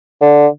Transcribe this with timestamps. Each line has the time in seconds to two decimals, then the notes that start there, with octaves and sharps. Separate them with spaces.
0.21 D3